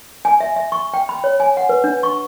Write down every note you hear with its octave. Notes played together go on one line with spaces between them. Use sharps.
G#5
E5
E5
C#6
G5
B5
C#5
G#5
F#5
B4
D4
C#6